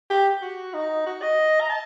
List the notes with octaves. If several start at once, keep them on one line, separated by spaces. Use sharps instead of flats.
G4
F#4
D#4
F#4
D#5
A#5
A5